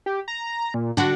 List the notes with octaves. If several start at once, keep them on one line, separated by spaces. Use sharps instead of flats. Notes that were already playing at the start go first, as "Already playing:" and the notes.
G4
A#5
A#2
D3 D4 F#4